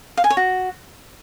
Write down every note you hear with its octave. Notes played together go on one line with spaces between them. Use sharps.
F5
G#5
C#5
F#4